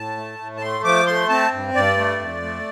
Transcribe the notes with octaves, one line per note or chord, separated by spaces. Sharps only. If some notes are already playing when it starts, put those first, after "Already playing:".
Already playing: A2 A5
A3
A2
A5
A3 C6
F3 D6
A3 C6
C4 A5
G2
G2 D5
A3
F2
A3